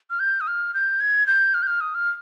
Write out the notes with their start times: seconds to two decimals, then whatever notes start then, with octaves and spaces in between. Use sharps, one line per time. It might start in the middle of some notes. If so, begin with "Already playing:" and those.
0.10 F6
0.20 G6
0.41 D#6
0.47 F6
0.74 G6
1.00 G#6
1.27 G6
1.54 F6
1.62 G6
1.67 F6
1.81 D#6
1.95 F6